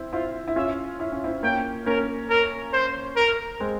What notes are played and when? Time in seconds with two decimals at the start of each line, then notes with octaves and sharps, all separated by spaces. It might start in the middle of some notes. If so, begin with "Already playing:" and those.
Already playing: C4 E4
0.13 C4 E4 F4
0.48 E4
0.56 C#4 F4 E5
1.00 E4
1.12 C#4
1.24 C4 E4
1.43 A#3 C#4 G5
1.86 A#3 C#4 A#4
2.30 A#4
2.73 C5
3.16 A#4
3.60 G#3 C4